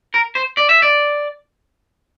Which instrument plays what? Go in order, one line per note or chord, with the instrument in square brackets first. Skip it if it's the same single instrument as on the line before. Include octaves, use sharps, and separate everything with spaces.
[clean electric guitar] A#4
C5
D5
E5
D5